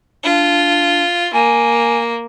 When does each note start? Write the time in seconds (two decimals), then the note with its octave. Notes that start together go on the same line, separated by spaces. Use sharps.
0.24 D4 F4
1.33 A#3 G#5